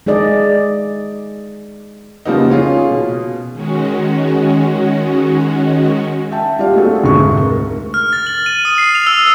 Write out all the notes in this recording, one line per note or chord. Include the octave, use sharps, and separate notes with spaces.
G#3 D#4 G#4 D5 D#5
C#3 F3 G3 A#3 B3 D#4
C#4 F4 G#4
B2
D#3 G#3 C#4 F#4
E5 G5 A5
G3 F4 D5 F5
A3 C4 F#4 G#4 A4
F1 D2 G#2 A3 C#6
A#4
F6
A6
F#7
D#7
D#6
C7
F7
E6